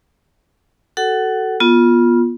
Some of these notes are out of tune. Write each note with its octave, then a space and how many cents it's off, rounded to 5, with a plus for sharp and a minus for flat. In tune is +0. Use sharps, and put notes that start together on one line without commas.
F#4 +20 A4 +5 F#5 +25
B3 -30 F4 +0